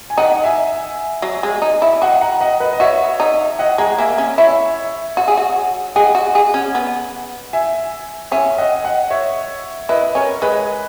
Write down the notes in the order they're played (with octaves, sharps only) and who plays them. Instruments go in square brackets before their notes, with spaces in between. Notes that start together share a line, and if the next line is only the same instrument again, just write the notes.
[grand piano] G#5
[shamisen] D#4 [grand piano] D#5 F#5
[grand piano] E5 G#5
[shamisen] F#3
G#3
D#4
E4
[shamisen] F#4 [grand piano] D#5 F#5
[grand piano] F#5 A#5
D#5 F#5
B4 D#5
D#5
[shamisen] F#4 [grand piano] C#5 E5
[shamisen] D#4
[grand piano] D#5 F#5
[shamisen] G#3 [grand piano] F#5 A#5
[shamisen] A#3 [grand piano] E5 G#5
[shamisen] C#4
[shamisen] E4 [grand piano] C#5 E5
[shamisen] F#4
G#4
F#4
[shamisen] G#4 [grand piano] D#5 F#5
[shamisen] F#4
G#4
C#4
B3
[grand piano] E5 G#5
[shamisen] C#4 [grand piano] E5 G#5
[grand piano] D#5 F#5
D#5 F#5
C#5 E5
[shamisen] E4 [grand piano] B4 D#5
[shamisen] C#4 [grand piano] A#4 C#5
[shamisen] G#3 [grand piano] B4 D#5